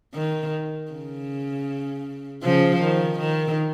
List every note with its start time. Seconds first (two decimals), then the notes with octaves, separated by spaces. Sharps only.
0.14 D#3
0.92 C#3
2.43 C#3 F3
2.81 D#3
3.19 D#3